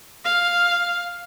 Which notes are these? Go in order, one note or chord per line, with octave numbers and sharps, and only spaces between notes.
F5